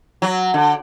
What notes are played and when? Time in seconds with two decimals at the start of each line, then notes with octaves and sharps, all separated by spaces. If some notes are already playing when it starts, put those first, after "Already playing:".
0.22 F#3
0.54 D3